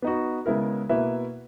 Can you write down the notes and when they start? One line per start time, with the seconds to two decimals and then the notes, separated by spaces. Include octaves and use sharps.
0.02 B3 D#4 F#4
0.46 C#3 G#3 B3 E4 A#4
0.89 B2 A#3 E4 B4 E5